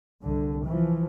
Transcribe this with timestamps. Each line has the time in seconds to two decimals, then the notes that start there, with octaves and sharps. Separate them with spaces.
0.22 C2 D3
0.66 E3 F3